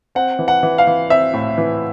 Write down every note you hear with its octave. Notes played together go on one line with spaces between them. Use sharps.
C4 F#5
E3
F#5
E3
F5
E3
C4 E5
A2
E3